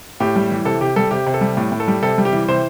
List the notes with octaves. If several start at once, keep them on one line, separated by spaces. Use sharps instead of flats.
A2 G4
G3
E3
C3 A4
C3 G4
G3 A4
C3 G4
C3
A4
G3
A2
A2
A4
G3
C3 A4
G3
G4
E3
C3 C5